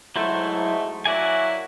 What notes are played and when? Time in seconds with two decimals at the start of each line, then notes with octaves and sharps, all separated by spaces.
0.16 G#2 F#3 A3 E4 C5
1.05 F#3 A#3 E4 F#4 D5 G#5